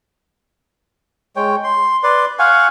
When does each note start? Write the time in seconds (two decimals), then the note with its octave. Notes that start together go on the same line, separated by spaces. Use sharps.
1.36 G#3 C#5 G5
1.64 C6
2.03 B4 D5 C6
2.39 F5 F#5 G#5 C#6